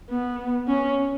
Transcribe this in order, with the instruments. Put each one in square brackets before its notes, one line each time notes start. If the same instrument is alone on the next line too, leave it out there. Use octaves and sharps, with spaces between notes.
[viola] B3
C#4